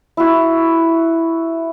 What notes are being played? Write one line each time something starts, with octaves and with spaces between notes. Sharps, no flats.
E4 F#4